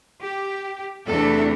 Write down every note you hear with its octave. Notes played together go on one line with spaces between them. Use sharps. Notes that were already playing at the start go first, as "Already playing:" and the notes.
G4
E2 C3 E3 A3 D4 A4